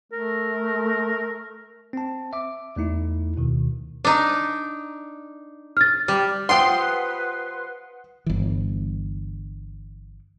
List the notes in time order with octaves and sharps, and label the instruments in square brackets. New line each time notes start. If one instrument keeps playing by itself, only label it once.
[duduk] A3 [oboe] A#4
[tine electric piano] C4 A5
E5 D6
E2 A3 D#4 E4
D2 B2 D#3
[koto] D4 D#4
[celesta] F6 A6
[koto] G3
[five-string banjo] F3 F4 G4 [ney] B4 [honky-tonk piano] F#5 D#6 [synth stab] C6
[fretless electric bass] G1 E3